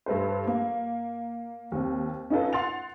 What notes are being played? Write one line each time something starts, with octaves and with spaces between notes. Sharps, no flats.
G2 A4 B4 C5
A#3
D#2 C4
C#4 D#4 F4 A4 B4
F#5 C6 A6 F7